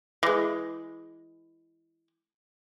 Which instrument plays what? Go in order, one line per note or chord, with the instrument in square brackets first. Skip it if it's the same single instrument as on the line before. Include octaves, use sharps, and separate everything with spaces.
[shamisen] E3 G#3